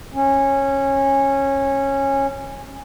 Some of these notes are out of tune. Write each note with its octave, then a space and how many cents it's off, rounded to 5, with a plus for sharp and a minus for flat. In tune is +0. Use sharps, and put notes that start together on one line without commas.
C#4 -15